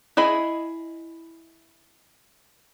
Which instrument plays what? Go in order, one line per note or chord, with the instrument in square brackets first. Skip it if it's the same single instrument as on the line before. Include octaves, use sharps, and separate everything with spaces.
[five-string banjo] E4 G#4 D#5 B5